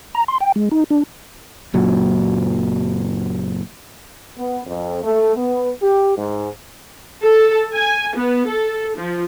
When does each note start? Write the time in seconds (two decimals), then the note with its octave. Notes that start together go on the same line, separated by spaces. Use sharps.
0.15 A#5
0.28 C6
0.40 G5
0.56 G#3
0.71 D#4
0.90 D4
1.74 F#1 A#2 F#3
4.38 B3
4.67 F2
5.04 A3
5.36 B3
5.82 G4
6.17 G#2
7.23 A4
7.75 G#5
8.16 B3
8.48 A4
8.97 F3